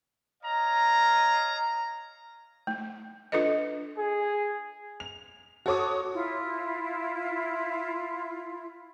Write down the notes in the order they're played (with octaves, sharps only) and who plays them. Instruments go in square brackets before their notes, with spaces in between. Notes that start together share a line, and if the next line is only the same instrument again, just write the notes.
[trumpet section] C#5 D#5 F5 A#5
[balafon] A3
D4 F4 A4 B4 D#5
[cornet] G#4
[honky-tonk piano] F7
F#4 A4 C#5 D6 D#6
[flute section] E4 F4